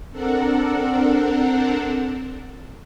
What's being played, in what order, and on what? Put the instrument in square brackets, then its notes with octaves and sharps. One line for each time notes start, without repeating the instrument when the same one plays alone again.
[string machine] C4 D4 A4 A#4 F#5